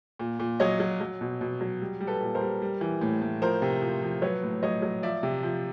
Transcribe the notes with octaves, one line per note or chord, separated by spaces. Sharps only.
A#2
A#2
F#3 C#5 D#5
F#3
F#3
B2
B2
F#3
G3
G3
A4 B4
A#2
A#4 C5
G3
G3
E3
A2
A2
F3 A#4 C5
C3
F3
F3
F#3 B4 C#5
A2
F#3 C#5 D#5
F#3
F3 D5 E5
C3
F3